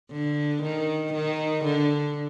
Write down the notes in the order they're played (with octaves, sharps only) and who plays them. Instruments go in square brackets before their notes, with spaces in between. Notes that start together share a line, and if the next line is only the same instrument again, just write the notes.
[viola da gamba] D3
D#3
D#3
D3